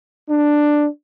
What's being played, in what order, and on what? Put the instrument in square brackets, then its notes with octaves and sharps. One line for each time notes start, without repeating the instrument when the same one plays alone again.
[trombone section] D4